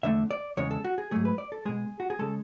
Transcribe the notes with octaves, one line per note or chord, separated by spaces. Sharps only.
E2 D3 A3 E5
D5
E2 C#3 G#3 C#5
A4
F#4
G#4
G#2 F#3 A3 G#4
B4
D5
A4
B2 G#3 G#4
F#4
G#4
C#3 G#3 A4